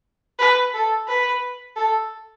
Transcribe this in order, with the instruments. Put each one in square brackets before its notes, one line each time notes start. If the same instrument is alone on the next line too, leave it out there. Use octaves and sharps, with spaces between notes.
[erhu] B4
A4
B4
A4